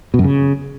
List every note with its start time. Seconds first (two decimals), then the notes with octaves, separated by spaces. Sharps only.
0.14 B2
0.19 F#2
0.24 C#3